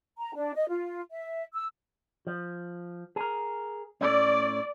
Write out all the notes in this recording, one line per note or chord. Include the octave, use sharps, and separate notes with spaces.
A#5
D4
D#5
F4
E5
E6
F3
G#4 A#4
A2 A3 C#4 D5